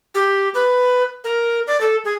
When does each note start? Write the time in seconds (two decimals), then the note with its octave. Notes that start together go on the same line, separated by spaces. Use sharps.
0.15 G4
0.54 B4
1.24 A#4
1.67 D5
1.81 A4
2.05 G#4